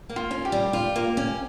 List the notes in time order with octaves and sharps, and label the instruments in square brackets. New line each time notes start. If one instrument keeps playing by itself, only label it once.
[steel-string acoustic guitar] A#3
[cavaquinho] F4
[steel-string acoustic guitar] C#4
[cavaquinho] G4
[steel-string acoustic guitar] G3
F4
A#3
C#4